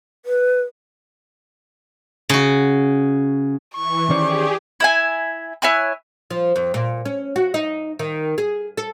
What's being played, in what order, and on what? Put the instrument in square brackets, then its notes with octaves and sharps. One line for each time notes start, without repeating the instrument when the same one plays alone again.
[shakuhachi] B4
[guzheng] C#3 F#4
[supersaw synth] E3 [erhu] C#6
[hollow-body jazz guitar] D#3 C#4 C5 [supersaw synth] G4 G#4 [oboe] D5
[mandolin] E4 E5 G#5
E4 C#5 G#5 F#6
[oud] F3
F2
A#2
C#4
F#4
D#4
D#3
G#4
A4